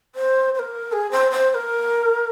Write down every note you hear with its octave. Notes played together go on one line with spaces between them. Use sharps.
C5
C5
A#4
G#4
C5
C5
C5
A#4